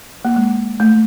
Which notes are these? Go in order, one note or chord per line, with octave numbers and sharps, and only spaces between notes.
A#3
G#3
A3